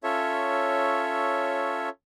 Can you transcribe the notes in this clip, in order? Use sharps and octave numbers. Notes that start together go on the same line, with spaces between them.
C#4 F4 A4 C#5 E5